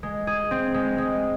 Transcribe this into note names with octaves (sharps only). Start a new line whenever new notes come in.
G#3
G#4
C4
G#3
G#3